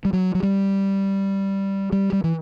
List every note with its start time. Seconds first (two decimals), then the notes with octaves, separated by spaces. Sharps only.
0.05 G3
0.13 F#3
0.35 F#3
0.43 G3
1.92 G3
2.13 G3
2.24 E3